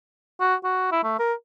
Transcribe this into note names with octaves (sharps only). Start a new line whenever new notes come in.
F#4
F#4
E4
A3
A#4